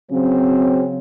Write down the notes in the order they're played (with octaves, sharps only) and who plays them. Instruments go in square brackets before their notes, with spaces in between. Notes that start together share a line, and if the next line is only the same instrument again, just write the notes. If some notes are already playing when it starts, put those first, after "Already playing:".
[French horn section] C#3 F#3 C4